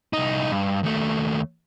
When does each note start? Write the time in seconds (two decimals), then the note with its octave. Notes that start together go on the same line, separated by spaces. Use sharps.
0.13 C2 D#4
0.52 G2
0.83 D#2 A3